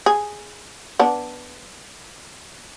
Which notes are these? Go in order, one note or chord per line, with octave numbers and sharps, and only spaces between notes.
G#4
B3 D4